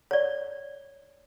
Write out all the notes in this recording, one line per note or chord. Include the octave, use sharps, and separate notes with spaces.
C#5 D5